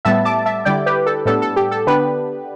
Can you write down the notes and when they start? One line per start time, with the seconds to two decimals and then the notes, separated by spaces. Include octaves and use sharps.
0.05 A2 G3 B3 E5 A5
0.25 A5 D6
0.46 E5 A5
0.65 D3 G3 E4 D5 G5
0.86 G4 B4
1.06 A4
1.26 A2 G3 B3 D4 A4
1.42 A4
1.56 G4
1.71 A4
1.87 D3 B3 D4 G4 B4